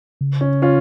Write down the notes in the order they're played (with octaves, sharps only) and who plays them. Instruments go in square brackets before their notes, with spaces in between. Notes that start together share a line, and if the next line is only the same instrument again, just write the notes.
[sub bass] C#3
[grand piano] C#4
C#4 F4